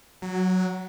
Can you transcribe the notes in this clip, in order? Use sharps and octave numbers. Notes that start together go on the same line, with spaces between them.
F#3